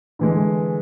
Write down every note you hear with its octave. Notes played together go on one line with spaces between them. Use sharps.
D3 E3 G#3